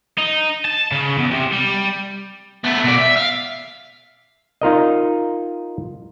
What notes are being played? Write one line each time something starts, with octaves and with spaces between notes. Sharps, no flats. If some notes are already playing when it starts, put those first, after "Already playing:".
D#4
A5
C#3
E2
C3
G3
A3 B3
B2 D5
E5
F5
D#4 F4 A#4 D#5